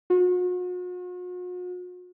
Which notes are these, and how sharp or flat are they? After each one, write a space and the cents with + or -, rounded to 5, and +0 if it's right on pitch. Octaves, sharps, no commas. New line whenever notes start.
F#4 -45